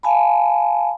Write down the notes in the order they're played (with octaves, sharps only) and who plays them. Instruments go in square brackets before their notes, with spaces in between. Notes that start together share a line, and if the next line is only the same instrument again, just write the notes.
[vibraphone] F5 G#5 A5 B5